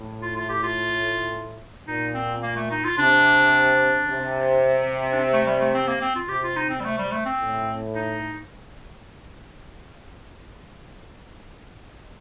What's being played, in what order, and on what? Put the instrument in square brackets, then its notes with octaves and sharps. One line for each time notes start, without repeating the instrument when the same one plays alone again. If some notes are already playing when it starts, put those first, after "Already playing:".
Already playing: [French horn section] A2
[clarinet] F4
F4
G4
F4
[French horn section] A#2 [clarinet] D#4
[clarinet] C4
A#3
A3
D#4
F4
[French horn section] C3 [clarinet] D4
[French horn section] C3
[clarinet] D4
C4
A3
G3
A3
C4
A#3
C4
F4
[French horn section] C3 [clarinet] G4
[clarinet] F4
D#4
C4
G3
A3
G3
A3
C4
[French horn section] A2
[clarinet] D#4